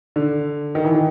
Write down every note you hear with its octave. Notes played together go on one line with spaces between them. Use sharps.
D3
D#3
E3
D#3